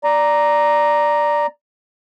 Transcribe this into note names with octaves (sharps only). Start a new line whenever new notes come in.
D5 A#5